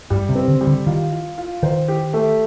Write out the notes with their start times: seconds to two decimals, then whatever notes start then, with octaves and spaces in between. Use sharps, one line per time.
0.10 G2 G3
0.29 C3
0.35 C4
0.48 D3
0.61 G3
0.67 D3
0.86 D#3 F4
1.12 F4
1.38 F4
1.63 D#3 C5
1.88 G4
2.13 A3